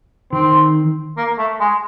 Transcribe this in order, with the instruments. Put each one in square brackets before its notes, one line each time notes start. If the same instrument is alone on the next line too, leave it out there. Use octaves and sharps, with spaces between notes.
[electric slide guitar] D#3 [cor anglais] C4
[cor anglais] A#3
A3
G#3